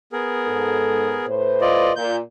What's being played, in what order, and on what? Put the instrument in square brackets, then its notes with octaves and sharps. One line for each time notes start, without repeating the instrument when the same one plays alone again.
[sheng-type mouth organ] B3 G#4 A#4
[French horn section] G#2 A4
A2 B4 C5
[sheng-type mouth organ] F4 D5 D#5
[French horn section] A#2 [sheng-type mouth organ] G6